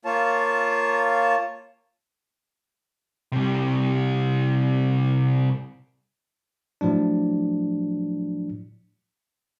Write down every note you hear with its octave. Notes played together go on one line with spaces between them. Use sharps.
A#3 F4 C#5 A5
C3 G3
A2 F3 F#3 D4